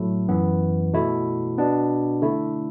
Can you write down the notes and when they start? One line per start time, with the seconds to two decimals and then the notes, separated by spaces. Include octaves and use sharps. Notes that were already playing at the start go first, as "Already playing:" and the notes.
Already playing: A2 F#3 A3 E4
0.29 F#2 E3 B3
0.93 B2 A3 E4
1.58 B2 B3 D4
2.22 D3 A3 E4